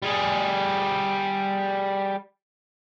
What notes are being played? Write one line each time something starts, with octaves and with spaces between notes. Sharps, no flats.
G3 G#4